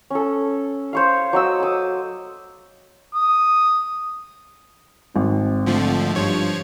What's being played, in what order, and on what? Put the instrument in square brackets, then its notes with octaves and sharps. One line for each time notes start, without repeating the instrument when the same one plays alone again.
[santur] C#4 A4
C5 C#5 F5
F#3 D#5 E6
D6 D#6
[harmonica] D#6
[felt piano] G#1 [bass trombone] C4
[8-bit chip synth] D3 F3 A3
[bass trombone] G2 [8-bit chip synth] F3 C#5